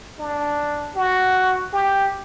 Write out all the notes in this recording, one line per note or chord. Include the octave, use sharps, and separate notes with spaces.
D4
F#4
G4